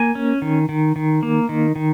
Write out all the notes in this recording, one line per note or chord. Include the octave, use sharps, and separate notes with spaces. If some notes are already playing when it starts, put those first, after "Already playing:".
Already playing: A#3 G#5
C#4
D#3
D#3
D#3
A#3
D#3
D#3